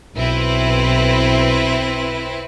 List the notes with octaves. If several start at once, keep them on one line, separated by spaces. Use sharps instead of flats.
B1 C4 E4 B4